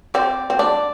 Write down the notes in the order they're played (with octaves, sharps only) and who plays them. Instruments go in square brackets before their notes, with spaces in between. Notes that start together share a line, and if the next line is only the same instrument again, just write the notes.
[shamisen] C4 [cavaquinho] D5
[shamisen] C4
[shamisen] D4 [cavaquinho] D5